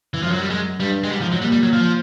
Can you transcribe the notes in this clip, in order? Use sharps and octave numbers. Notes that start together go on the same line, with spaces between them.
E3
F#2 F3
F#3
G3
G#3
G2 G3
G#3
G#2 G3
F3
F#3
A#2 G3
G3
F#3
F3